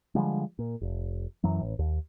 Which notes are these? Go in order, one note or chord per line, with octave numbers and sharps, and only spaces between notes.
D3 F3 G3 G#3
A#2
F1
F#2 E3 F#3
A1
D#2